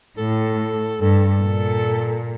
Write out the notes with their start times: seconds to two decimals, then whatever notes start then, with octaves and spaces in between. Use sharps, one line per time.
0.18 A2 A4
1.01 G2 A4
1.42 A#2